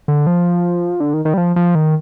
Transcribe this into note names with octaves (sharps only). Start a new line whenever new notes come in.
D3
F3
D3
D#3
D#3
G3
F3
F3
D#3